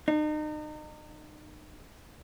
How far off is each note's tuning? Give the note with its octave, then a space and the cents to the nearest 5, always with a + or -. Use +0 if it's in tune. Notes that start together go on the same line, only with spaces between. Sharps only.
D#4 -35